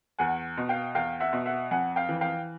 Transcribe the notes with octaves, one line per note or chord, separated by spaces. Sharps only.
E2 F#5 G#5
B2
F5 G5
E2 F5 G5
E5 F#5
B2
E5 F#5
F2 F#5 G#5
F5 G5
E3
F5 G5